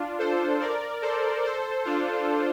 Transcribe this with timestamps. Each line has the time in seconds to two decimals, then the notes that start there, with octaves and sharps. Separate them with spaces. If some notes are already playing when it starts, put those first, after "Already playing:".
Already playing: D4 F4
0.19 A4 C5
0.61 A#4 D5
1.02 A4 C5
1.45 A4 C5
1.85 D4 F4